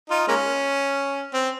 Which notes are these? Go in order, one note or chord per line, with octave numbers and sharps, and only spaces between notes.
D#4 F4
G#3 A#3 C#4
C4